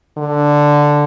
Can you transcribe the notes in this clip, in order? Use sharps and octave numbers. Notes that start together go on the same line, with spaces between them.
D3